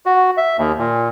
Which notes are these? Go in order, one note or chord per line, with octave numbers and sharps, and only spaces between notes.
F#4
E5
D#2
A#2